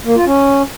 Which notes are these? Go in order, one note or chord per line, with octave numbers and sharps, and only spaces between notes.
A#3
F4
C#4